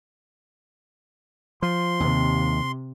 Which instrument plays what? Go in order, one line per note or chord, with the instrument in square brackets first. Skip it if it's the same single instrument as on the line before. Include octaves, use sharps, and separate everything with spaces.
[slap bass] F3 [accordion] C6
[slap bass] D#2 [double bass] C3